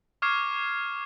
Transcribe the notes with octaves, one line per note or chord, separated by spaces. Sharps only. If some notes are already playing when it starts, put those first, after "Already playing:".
C#6 D6 F6 G#6 C7 E7